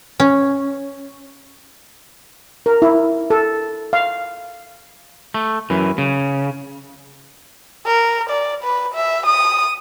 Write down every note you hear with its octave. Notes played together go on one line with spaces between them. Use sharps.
C#4
A#4
E4
A4
F5
A3
F#2 E3
C#3
A#4
D5
B4
E5
D#6